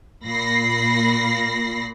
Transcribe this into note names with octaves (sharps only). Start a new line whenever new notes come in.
A#2 B5 A#6 C7